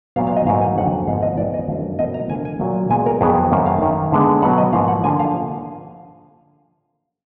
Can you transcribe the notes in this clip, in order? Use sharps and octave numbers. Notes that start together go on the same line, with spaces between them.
A#2 F#3 B3 F5
F5
D#5
G#2 F#3 A#3 F5
G#5
F2 D3 F#3 F#5
G#2 F3 B3 F5
D#5
F2 F3 B3 D5
D#5
F#2 D3 F#3 F5
B2 A#3 D#5
A#5
D3 F3 A#3 G#5
G#5
A#2 F#3 A#3
A#2 G#3 B3 G#5
A#4
F2 D#3 F#3 B3 G#4
F#2 D#3 A#3
F5
F#2 D#3 A#3
D3 G#3 B3
B2 F#3 B3 F#5
D#5
G#2 F3 A#3 F5
F#5
D3 F3 A#3 G#5
F5